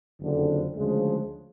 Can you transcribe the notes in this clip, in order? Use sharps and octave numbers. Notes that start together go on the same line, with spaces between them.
F#1 F2 D3
D2 C#3 F3 G#3